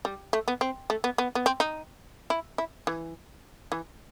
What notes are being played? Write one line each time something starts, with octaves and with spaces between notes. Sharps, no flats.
G3
A3
B3
C4
A3
B3
B3
B3
C4
D#4
E4
E4
E3
E3